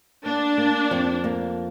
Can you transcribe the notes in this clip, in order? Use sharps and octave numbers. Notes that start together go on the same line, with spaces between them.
A#3 D4
A#3
F2
A#3